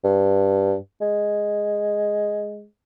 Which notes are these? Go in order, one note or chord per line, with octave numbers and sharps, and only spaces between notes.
G2
G#3